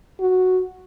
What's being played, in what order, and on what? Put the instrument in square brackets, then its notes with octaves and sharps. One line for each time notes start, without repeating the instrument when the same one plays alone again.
[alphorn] F#4